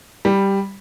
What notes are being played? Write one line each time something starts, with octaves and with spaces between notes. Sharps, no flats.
G3